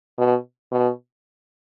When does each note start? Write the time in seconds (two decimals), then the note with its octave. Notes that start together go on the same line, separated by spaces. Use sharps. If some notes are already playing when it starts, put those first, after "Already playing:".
0.18 B2
0.72 B2